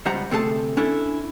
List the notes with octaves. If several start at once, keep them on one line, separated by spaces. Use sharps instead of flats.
C#2 G3 C5 F#5 A#5
D2 C3 A3 G#4 A5
C#4 D4 E4 A4